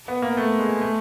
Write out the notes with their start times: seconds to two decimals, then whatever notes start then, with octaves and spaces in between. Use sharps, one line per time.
0.08 B3
0.22 A#3
0.37 A3
0.59 G#3
0.81 A3